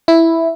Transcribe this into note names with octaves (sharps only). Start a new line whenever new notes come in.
E4